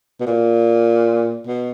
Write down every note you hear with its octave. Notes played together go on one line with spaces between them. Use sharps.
B2
A#2
B2